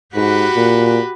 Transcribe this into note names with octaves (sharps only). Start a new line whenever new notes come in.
G#2 F#4 G4 B4
A#2